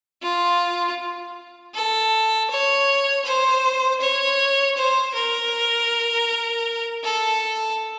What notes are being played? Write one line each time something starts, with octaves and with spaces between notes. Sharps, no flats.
F4
A4
C#5
C5
C#5
C5
A#4
A4